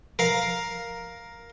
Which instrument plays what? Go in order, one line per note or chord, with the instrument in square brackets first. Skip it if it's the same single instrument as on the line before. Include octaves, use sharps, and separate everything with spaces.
[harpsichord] A#4 F5